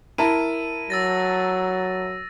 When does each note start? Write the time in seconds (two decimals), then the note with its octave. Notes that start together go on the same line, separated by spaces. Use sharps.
0.18 E4 A#4 A5 D#7
0.90 F#3 E6 A6 A#6